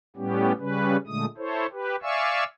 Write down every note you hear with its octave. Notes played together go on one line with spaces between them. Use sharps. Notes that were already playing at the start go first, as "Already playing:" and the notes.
A2 G3 B3 C#4 G4
C#3 G3 C#4 B4
A#2 D3 G#3 A3 D#6
E4 A4 C5 C#5
G4 B4
D5 E5 F5 G#5 C#6 E6